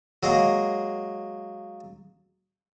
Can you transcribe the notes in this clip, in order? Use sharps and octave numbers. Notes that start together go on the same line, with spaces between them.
F#3 G#3 A#3